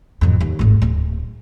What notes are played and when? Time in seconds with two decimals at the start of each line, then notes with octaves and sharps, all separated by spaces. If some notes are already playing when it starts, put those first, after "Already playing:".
0.21 A1 F2
0.41 D#2
0.59 G#1 A2
0.82 D1